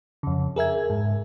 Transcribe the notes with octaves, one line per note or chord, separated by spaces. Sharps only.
F2 C#3
G#4 A#4 E5 G#6
G#2